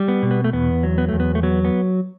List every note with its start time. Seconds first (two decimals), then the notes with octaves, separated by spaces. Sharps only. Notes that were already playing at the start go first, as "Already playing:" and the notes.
Already playing: G3
0.08 B3
0.23 B2
0.31 B3
0.44 A3
0.53 E2 B3
0.83 F#3
0.98 B3
1.09 E2 A3
1.20 B3
1.35 A3
1.43 F#3 B3
1.65 B3